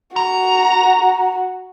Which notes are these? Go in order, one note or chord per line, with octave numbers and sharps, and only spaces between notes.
F#4 A#5